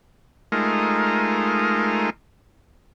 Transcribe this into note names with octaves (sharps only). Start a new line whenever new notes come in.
G#3 A3 D#4 F4 A#4